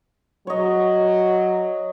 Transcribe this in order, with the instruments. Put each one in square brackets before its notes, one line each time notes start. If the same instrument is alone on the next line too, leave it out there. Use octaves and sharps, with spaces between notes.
[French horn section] F#3 [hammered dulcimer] C#5 D#5